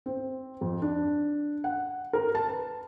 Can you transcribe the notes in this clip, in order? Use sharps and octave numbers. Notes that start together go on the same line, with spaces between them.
C4
F2
D4
F#5
A#4
A5
B4